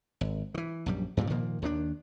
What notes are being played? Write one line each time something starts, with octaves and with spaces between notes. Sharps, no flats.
G#1
D#3 E3
A#1 F#2 G3
G2 A#2 C#3 G3
A#2 D#3 F3 A#3
D#2 D#3 B3 D4